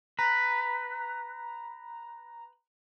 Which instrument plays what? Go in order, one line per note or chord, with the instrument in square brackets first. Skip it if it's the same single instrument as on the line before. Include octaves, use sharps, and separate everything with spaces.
[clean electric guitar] B4 [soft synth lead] A#5